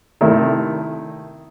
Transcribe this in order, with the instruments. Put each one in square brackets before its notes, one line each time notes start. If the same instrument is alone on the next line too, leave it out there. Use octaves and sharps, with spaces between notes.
[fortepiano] C3 D#3 A3 E4